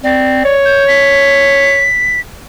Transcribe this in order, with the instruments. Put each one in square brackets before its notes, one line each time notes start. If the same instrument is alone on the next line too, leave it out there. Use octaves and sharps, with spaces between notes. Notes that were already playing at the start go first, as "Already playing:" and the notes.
[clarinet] C4 [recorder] D5
[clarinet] C#5
[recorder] G6
B6